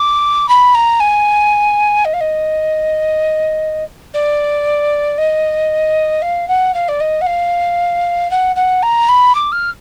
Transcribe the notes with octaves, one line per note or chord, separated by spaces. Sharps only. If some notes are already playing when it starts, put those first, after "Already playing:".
Already playing: D6
B5
A#5
G#5
D#5
F5
D#5
D5
D#5
F5
F#5
F5
D5
D#5
F#5
F5
F#5
F#5
A#5
B5
D6
F6